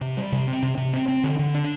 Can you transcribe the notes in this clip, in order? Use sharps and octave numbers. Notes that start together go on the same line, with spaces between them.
C3
G3
C3
C4
C3
C3
C4
C4
D3
D3
D4